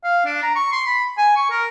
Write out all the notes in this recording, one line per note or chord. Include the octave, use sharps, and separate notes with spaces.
F5
D4
A#5
C#6
C6
B5
G#5
C#6
A#4